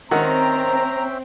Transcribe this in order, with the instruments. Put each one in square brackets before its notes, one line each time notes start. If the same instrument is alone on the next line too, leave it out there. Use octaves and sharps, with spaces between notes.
[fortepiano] D#3 F#5 [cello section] C4 [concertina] C#4 E5 G5 [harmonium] A#5